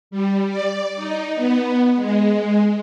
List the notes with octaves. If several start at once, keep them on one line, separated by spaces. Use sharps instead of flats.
G3
D5
D#4
B3
G#3